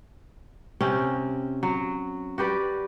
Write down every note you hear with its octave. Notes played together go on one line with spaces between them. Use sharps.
C3 C4 C#4
F#3
F#4 G4 B4 D5